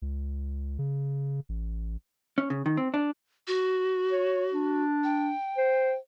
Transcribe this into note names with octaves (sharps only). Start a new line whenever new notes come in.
C#2
C#3
A1
C#4
C#3
D#3
C4
D4
F#4
C#5
D4
G5
C5